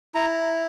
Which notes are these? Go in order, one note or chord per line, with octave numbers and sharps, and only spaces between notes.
E4 A#5